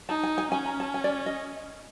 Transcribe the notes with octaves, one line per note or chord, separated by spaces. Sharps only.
D#4 A5
G#5
G#5
C#4 G#5
A#5
A5
G#5
D5
D#5